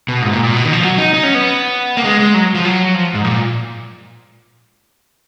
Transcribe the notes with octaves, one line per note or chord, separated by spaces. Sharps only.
B2
G#2
A#2
A#2
B2
D#3
F3
F#3
D#4
D#4
C#4
B3
A#3
G#3
G#3
F#3
F3
F#3
F3
G#2
A#2